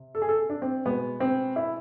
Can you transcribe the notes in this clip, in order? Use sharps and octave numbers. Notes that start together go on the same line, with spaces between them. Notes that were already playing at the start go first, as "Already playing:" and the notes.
Already playing: C3
A4
G#4
A4
D4
C4
B2 G#3 B3
C4
E4